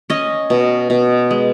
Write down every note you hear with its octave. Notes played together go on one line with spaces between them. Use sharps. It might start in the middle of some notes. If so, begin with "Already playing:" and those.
C#4 D#5
B2
B2
G#3